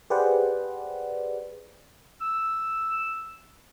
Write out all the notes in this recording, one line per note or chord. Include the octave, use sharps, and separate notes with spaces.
G4 G#4 B4 C5 D5 F#5
E6